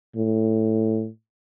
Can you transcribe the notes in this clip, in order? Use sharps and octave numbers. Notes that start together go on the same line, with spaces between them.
A2